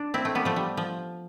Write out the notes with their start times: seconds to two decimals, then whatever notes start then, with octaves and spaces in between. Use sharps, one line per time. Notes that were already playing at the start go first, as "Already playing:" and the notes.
Already playing: D4
0.14 C4 E4
0.25 A3 C4
0.35 G3 B3
0.45 F3 A3
0.56 G3
0.77 F3